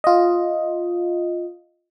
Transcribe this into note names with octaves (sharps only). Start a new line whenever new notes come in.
F4 D#5